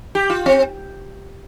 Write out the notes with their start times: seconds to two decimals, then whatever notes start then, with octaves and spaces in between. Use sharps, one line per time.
0.15 G4
0.30 F4
0.46 C4